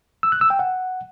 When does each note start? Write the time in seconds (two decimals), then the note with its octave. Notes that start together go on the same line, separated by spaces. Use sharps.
0.23 E6
0.32 F#6
0.41 E6
0.50 G5
0.59 F#5